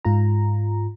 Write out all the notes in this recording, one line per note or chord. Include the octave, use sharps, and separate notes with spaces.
G#2 F4 A#5